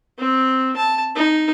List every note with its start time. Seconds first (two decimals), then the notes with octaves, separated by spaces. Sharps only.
0.19 C4
0.77 A5
1.16 D#4